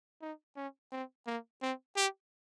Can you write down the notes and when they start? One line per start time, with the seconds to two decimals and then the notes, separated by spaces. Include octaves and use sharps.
0.22 D#4
0.57 C#4
0.92 C4
1.27 A#3
1.62 C4
1.96 G4